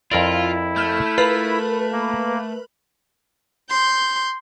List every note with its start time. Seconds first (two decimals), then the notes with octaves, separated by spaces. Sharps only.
0.11 F2 E4 F4 A#4 D5
0.76 A3 F6 G6
1.18 F4 A#4 B4 B5
1.92 A#3
3.70 C6 G6